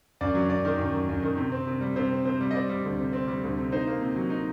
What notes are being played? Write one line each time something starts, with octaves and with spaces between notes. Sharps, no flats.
F#2 D5
F#3
F#2 D5
D#3
F#2
F#3
F#2
D#3
C3
C4
C3
G3
C3 C5
C4
C3 C5
G3
D#5
C4 D5
G3
D2
C3
C4
G3
D2
C3
D#4 C5
A#3
C3
F#3
D#4